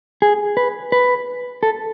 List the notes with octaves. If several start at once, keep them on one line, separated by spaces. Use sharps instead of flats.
G#4
B4
B4
A4